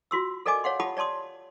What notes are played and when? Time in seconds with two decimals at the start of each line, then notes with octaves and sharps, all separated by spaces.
0.11 F4 F#4 C6 E6
0.46 A4 A#4 D5 D#5 G#5 D6
0.64 C#5 F5 F#5 C6
0.80 F4 G4 F#5 A5 B5 D#6
0.97 C#5 D5 A5 C6 D#6